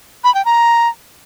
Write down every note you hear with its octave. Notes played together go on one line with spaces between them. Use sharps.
B5
G5
A#5